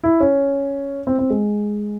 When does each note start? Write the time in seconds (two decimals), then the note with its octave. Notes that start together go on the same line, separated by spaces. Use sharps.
0.03 E4
0.20 C#4
1.07 C4
1.19 C4
1.30 G#3